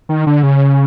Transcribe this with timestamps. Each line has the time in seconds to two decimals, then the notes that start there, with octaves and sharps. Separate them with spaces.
0.09 D#3
0.27 D3
0.43 C#3